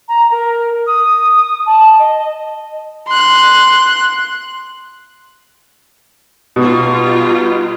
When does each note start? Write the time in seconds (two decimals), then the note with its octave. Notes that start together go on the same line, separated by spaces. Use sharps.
0.08 A#5
0.31 A#4
0.86 D#6
1.66 A5
1.99 D#5
3.08 C6 F#6
6.56 B2 G3 D#4 F4